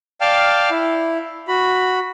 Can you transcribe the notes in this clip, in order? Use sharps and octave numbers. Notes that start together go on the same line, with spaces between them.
D5 F5 G5 A5 F6
E4
F#4 B5